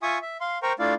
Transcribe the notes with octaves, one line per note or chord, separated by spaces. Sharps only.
F4 E5 G#5 C#6 D#6
E5
F5 C6
A#4 C5 G5 A#5 C#6
A3 D4 E4 F4 D5 F5